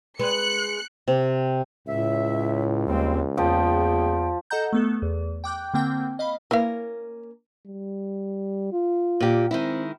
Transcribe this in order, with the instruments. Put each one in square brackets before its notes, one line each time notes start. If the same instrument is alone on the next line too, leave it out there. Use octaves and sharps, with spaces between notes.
[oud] G#3 B4 [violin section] F#6 C#7
[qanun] C3
[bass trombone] C#2 [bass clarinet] A2 [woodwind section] E5
[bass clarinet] D#2 [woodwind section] G3 G#3 C4
[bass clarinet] E2 [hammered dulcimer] F3 [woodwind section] A#3 G#4 G5
[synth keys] A4 D#5 F#5 A#5 G6
A3 B3 A4
E2
G5 D6 F#6 G6
D3 A#3 C4 G5 G6
D#5 F5 B5
[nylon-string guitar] A#3 C#4 A#4 [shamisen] E4 B4 F5
[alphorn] G3
F4
[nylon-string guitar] A#2 G4
[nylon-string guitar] D#3 G#3 E4 [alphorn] C4